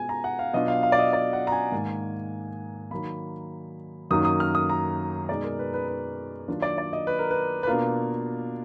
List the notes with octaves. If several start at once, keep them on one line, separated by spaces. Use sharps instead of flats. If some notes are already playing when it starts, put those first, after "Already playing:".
Already playing: B2 G#3 B3 F4 G#5
A#5
F#5
F5
B2 F#3 D4 F4 D#5
F5
F5
D5
D#5
D5
F#5
A#5
G#5
G#2 D#3 A#3
D#3 F#3 A#3 B5
F#2 D#3 F#3 A#3 D#4 D#6
D#6
F6
D#6
A#5
B2 G#3 D#4 D5
A#4
B4
B4
B4
D#3 F#3 A#3 D4 F4
D5
D5
D#5
B4
A#4
B4
B4
B2 A#3 D4 F4 A#4